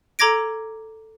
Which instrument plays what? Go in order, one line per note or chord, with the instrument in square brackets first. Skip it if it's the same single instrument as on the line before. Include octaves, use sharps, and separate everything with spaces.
[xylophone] A4 A#5 D6 G#6 A#6 D7